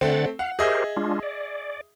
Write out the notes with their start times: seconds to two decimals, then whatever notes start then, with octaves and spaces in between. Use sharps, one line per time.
0.01 D3 A3 C4 F#5 A6
0.39 F5 F#5
0.59 G4 G#4 A#4 C5 D#5 E5
0.96 G#3 D4 F4
1.23 D5